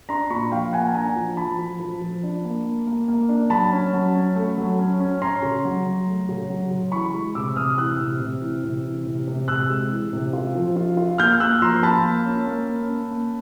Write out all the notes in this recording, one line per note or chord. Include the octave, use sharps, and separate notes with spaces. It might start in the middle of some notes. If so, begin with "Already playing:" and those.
D4 A#5 C6
A#2 B5 C#6
F3 F5 G5
A#3 F#5 G#5
A5
D4 G#5 A#5
F3
F3 A5 B5
F3
F3
F3
D4
A#3
A#3
A#3
A#3
D4
F#3 A5 B5
C#4
F#3
C#4
A3
F#3
C#4
C#4
C#4 A#5 C6
C#3
F#3
F#3
A3
C#3
F#3
C#3
E3 B5 C#6
G#3
C3 D6 E6
C3 D#6 F6
E3 E6 F#6
C3
C3
E3
C3
E3
C3
C3
C3 E6 F#6
G#3
E3
C3
F4
F3
F4
F4
A#3 F6 G6
A#3 E6 F#6
F3 A#5 C6
F4 A5 B5
A#3
C#4
A#3
C#4
C#4
A#3